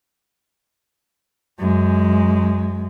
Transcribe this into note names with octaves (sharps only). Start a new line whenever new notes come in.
F#2 G#3